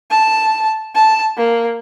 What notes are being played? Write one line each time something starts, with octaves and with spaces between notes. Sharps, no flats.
A5
A5
A#3